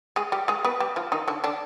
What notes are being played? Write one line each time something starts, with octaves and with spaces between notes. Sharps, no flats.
G#3 G#4
G3 G4
G#3 G#4
B3 B4
G3 G4
F3 F4
D#3 D#4
D3 D4
D3 D4